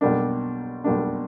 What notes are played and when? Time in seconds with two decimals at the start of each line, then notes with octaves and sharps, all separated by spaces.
0.01 B1 B2 G3 A#3 D4
0.84 B1 B2 G3 A#3 D4